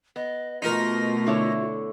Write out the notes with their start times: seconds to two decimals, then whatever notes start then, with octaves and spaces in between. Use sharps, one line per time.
0.16 B3 D#5
0.62 B2 A3 D#4 F4 A#4
1.26 D3 E4 C#5